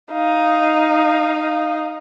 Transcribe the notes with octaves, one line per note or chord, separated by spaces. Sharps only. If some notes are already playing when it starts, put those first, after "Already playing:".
D#4 F5